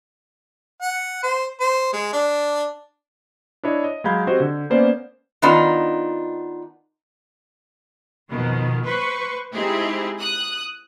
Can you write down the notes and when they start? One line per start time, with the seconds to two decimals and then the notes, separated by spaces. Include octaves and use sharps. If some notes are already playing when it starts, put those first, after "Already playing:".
0.82 F#5
1.23 C5
1.60 C5
1.93 G#3
2.13 D4
3.63 D4 E4 C#5 D#5
3.84 D#5
4.04 F#3 G#3 F5 B5 G6 G#6
4.27 C4 F#4 G4 C5 D#5
4.40 D3
4.70 A#3 B3 C#4 C5 D5
5.42 D#3 B3 D4 D#4 F4
8.31 F2 B2 D#3
8.86 B4 C5 C#6
9.53 G#3 C4 D#4 E4 G4 G#4
10.19 D#6 F#6